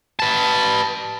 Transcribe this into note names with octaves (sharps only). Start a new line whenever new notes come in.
B4 A5